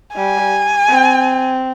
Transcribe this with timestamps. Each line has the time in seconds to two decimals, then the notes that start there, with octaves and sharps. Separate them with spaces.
0.16 G3 G#5
0.88 C4